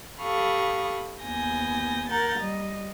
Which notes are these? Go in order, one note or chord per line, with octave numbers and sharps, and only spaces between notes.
G4 A4 F5 B5 C#6 D#6
D#2 B3 G#5 G6 A#6
A#4 F#5 A#5 G6 A6
G3 D#5